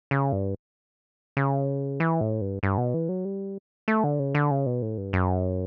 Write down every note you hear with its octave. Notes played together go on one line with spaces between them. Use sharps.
C#3
G2
C#3
E3
A2
G2
G2
B2
E3
F#3
G3
A3
D3
C#3
D3
C#3
B2
A2
G2
F#2